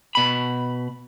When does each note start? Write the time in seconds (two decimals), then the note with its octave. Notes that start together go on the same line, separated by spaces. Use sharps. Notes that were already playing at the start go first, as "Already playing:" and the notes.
0.15 B2 B5